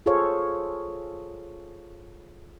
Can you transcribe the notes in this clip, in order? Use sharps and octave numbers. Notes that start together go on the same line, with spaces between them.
F4 G#4 A4 C5 C#5 F5